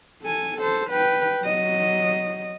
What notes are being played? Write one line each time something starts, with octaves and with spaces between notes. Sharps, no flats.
A4 G#5
A4 C5
B4 G5
F#3 D#5